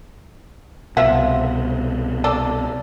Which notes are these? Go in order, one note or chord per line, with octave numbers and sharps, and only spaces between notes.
C2 B2 F3 E5 F#5
A4 D5